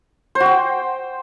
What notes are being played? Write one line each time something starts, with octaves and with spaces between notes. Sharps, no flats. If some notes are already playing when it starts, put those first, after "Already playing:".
C5
F#4
G5